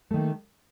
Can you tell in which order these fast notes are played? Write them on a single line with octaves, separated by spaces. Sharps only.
A3 D#3 A#3